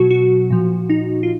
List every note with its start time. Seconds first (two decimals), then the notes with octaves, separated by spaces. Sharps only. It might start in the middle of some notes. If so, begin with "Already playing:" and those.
Already playing: B2 F#3 F#4
0.11 F#4
0.50 A#2 F3
0.90 D#4
1.23 F4